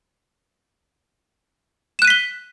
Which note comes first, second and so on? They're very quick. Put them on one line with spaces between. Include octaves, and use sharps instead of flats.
E7 F#6 D#7 B6 G7